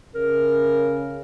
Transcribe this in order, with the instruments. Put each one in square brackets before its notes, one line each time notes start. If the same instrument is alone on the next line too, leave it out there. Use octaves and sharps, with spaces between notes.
[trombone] C#3 [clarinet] A#4